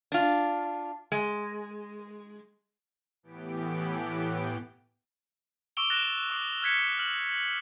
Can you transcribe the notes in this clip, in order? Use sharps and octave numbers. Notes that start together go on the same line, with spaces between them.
D4 F4
G#3
A2 E3 B3 G4 D7
C#6 D6 E6 D7 F7 G7
F#6 A6 A#6 D7 E7 F7
D6 D#6 D7
F6 F#6 G#6 B6 C#7
F6 F#7